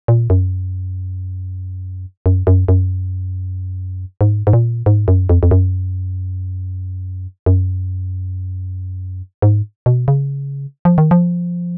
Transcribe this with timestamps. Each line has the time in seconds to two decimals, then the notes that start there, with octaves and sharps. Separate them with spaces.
0.08 A#2
0.30 F#2
2.26 F#2
2.47 F#2
2.68 F#2
4.21 G#2
4.47 G#2
4.53 A#2
4.86 G#2
5.08 F#2
5.29 F2
5.43 F2
5.51 F#2
7.46 F#2
9.42 G#2
9.86 B2
10.08 C#3
10.85 F3
10.98 D#3
11.11 F3